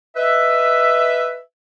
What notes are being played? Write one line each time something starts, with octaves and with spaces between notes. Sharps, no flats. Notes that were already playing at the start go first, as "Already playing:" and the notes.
B4 D#5 E5